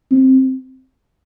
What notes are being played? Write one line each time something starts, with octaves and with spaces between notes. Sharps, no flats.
C4